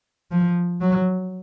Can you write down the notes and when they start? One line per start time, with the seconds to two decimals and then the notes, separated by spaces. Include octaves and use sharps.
0.31 F3
0.81 F#3